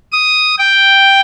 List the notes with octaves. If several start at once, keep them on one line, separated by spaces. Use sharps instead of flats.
D#6
G5